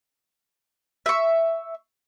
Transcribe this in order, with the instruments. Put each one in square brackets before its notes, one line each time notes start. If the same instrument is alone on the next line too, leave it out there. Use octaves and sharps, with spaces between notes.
[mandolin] E5 C#6